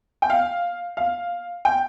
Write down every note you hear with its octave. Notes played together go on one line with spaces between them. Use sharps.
G5
F5
F5
G5